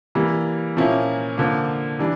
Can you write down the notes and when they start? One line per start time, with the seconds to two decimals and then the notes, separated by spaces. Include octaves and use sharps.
0.15 E3 G3 A#3
0.77 A#2 F3 A#3 C#4 E4
1.38 D3 F3 A#3
1.99 E3 G3 D4